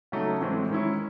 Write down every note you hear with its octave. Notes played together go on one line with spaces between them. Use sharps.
C#3 F#3 A3 D#4
A2 E3 G#3 C4
D#3 G#3 C#4 E4